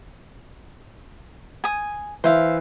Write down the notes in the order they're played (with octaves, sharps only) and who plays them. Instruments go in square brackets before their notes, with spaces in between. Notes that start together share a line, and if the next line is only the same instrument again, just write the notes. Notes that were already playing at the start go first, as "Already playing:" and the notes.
[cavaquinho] G#5 D#6
[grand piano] E3 [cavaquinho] C5 E5 F5